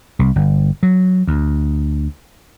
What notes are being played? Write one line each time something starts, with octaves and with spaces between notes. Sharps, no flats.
C2
G1
F#3
D2